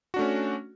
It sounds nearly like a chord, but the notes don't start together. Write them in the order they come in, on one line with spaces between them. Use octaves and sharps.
F#4 D4 A3 C#4